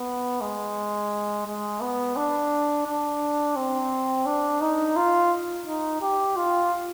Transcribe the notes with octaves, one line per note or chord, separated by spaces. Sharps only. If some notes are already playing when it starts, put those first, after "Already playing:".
Already playing: B3
G#3
G#3
B3
D4
D4
C4
D4
D#4
F4
D#4
G4
F4